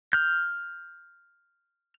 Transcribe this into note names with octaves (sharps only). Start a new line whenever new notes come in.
F6 G6